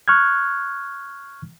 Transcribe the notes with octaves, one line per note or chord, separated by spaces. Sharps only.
C#6 F6 F#6 G#6